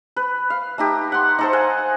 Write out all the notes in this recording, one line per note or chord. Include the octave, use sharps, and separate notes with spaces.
B4
F5
A3 D#4 G4
F#5 C6
D#4 A4 C5
F5 F#5 G#5